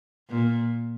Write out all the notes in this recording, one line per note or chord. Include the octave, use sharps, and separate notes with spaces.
A#2